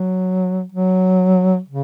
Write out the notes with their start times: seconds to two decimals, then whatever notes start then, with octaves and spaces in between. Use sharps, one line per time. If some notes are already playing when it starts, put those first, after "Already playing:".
Already playing: F#3
0.72 F#3
1.68 C#3